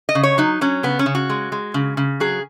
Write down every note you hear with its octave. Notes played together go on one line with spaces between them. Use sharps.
D#5
C#3
C#5
F#3 D#4
F#3 C#4
C#3 B3
C#4
C#3
F#4
G#3
G#3
C#3
C#3
F#3 G#4